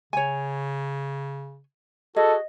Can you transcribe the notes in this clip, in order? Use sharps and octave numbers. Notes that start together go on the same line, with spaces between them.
C#3 C#5 G#5
F#4 G#4 A4 D#5